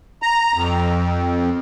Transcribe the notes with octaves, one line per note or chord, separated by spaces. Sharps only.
A#5
F2